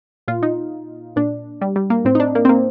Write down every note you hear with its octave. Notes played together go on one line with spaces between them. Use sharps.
A#2 F4
D#4
A#2 D4
G3
G3
A#3
A2 C4
D#4
D4
A#3
C4
A#3